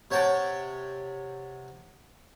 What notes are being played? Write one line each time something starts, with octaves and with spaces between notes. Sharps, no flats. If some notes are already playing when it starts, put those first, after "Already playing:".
C3 C#5 F#5 G5 A5